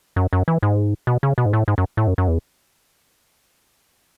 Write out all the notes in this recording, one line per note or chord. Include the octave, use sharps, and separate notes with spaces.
F#2
F#2
E3
G#2
B2
C#3
B2
G#2
A2
G#2
F#2
A2
F#2
F#2
E2